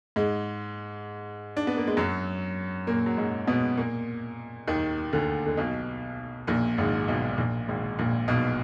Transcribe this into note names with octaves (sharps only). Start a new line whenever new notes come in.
G#2 G#3
D4
B3
A#3
G#3
F#2 F#3
A#2 A#3
F#3
G#2 G#3
B2 B3
A#2 A#3
D#2 D#3
D2 D3
D3
B1 B2
A#1 A#2
G#1 G#2
B1 B2
A#1 A#2
G#1 G#2
A#1 A#2
B1 B2